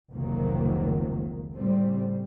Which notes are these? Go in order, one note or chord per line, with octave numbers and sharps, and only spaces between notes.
F1 C#2 C3 D#3 F#3 A#3
A2 C#3 G3 C4